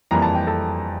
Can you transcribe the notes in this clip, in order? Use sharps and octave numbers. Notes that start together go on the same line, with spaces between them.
F2 E3 G3 A#3 A#5
A5
G5
A4 A5